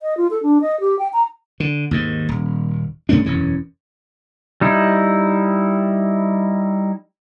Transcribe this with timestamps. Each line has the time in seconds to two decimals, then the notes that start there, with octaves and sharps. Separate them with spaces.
0.01 D#5
0.17 F4
0.30 A4
0.43 D4
0.61 D#5
0.80 G4
0.99 G5
1.13 A#5
1.60 D3
1.91 D#2 G#2 D#3
2.29 D#1
3.09 G2 A3 C#4 D4
3.26 E1 F#2 E3 C#4
4.61 G3 D#4 E4